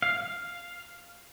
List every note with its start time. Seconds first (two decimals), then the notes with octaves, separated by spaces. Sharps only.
0.02 F5